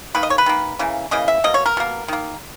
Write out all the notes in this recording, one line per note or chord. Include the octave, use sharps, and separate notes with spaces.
D#3 A#3 B4
D#5
C#5
B4
D#3 A#3
C#3 E3 A#3
C#3 E3 A#3 D#5
E5
B2 A#3 D#5
C#5
A#4
B2 A#3
D#3 A#3